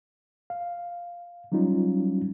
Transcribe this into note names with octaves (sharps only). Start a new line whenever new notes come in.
F5
F#3 G3 C#4 D#4 F4